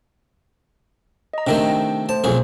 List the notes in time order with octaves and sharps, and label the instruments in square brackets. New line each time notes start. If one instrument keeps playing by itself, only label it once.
[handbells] D#5 A#5
[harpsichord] C3 D#3 A3 [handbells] D4 G5
[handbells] A3 C5 [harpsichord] A5
[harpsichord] B1 F2 G#4